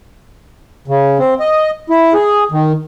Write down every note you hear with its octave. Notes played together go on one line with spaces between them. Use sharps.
C#3
C4
D#5
E4
G#4
D#3